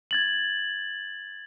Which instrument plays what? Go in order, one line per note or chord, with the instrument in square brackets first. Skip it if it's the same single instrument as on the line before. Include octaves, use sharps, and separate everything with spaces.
[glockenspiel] G#6 A6 F#7